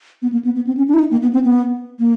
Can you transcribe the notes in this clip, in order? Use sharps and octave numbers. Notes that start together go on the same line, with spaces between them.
B3
A#3
B3
B3
C4
C#4
D4
E4
D#4
A#3
B3
C4
B3
A#3